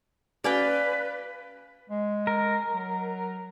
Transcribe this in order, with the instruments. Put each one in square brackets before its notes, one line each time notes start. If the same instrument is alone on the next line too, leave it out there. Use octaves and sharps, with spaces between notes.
[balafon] C#4 F#4 [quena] B4 [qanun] D5 F5 G5
[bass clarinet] G#3
[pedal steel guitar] A#4
[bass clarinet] F#3